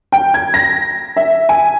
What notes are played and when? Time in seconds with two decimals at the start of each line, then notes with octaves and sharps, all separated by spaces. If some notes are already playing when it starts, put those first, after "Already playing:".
0.12 G5
0.34 G#6
0.54 A#6
1.16 E5
1.49 G#5